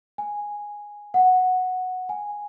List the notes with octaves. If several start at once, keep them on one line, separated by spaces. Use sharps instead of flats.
G#5
F#5
G#5